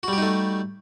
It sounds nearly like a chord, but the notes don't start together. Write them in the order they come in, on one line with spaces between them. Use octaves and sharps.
F#4 G3 G4 D#4 A3